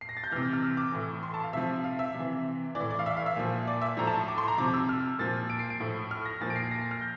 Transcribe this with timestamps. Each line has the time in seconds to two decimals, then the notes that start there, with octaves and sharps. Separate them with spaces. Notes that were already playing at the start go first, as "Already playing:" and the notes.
0.01 C7
0.09 A#6
0.17 A6
0.24 G6
0.31 C3 E3 F6
0.53 F6
0.62 E6
0.77 D6
0.92 A2 E3
1.23 C6
1.34 A5
1.43 F5
1.53 C3 F3 E5
1.84 F5
1.99 E5
2.15 C3 E3
2.75 E3 D5
2.81 A2
2.90 D5
2.99 F5
3.06 E5
3.17 F5
3.26 E5
3.36 A#2 F3
3.67 D5
3.81 E5
3.97 A2 F3 A#5
4.07 A5
4.28 D6
4.38 C6
4.48 A#5
4.58 C3 F3 D6
4.74 E6
4.89 F6
5.19 A#2 F3 A6
5.50 D7
5.59 C7
5.70 D7
5.80 A2 F3
6.11 F6
6.25 A#6
6.41 A#2 F3 A6
6.50 D7
6.56 C7
6.71 A#6
6.81 C7
6.91 F6
7.01 G6